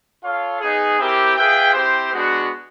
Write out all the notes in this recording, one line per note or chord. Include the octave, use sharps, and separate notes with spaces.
F4 A4 C#5 F5
B3 D#4 G#4
C4 E4 G4 A#4
F4 G#4 B4 E5 G5
C4 E4 G4 C5
G#3 B3 D4 F#4